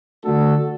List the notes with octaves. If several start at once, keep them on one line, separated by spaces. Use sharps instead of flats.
D3 A3 D4 F#4 A4